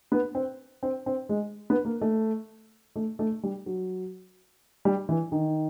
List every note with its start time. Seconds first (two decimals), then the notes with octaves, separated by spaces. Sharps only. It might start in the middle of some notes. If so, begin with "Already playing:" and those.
0.12 B3
0.35 C4
0.83 C4
1.06 C4
1.29 G#3
1.70 B3
1.85 A#3
2.01 A3
2.96 A3
3.19 A3
3.43 G3
3.66 F#3
4.85 G3
5.09 E3
5.32 D#3